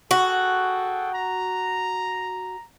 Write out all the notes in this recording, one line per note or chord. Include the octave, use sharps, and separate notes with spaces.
F#4 G#4 A4 G5
A#5